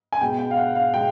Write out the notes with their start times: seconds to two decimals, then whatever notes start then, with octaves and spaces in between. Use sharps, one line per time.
0.12 G#5
0.21 B2 G#3 B3 G5
0.39 G5
0.51 F5
0.57 F#5
0.75 F5
0.93 B2 G#3 G5